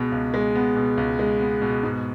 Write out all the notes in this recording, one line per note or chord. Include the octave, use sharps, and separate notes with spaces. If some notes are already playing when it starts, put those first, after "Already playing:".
Already playing: C#2 B2 G#3 B3
C#2
G#3
B3
B2
C#2
G#3
B3
B2
G#2